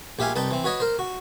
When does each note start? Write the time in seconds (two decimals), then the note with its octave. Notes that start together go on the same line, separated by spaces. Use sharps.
0.19 A#1 G4 E5 F5 G#5
0.36 C2 D#4 B4 G5 A5
0.51 E3 C4
0.64 F#4 B4 C#5 D#5
0.80 A#4 C5
0.99 F#4